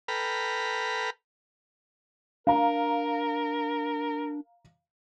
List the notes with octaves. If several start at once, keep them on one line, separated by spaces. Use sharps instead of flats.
A4 B4 G5 A#5 B5 F6
D4 A#4 F5 A#5